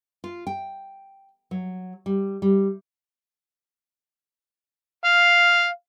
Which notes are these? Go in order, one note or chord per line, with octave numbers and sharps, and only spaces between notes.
F4
G5
F#3
G3
G3
F5